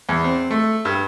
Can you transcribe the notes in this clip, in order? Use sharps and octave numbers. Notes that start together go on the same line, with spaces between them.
E2
C4
A3
G2